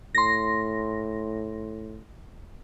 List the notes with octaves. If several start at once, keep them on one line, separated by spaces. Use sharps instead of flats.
A2 C6 A#6